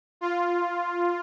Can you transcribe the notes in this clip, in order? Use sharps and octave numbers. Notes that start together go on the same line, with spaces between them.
F4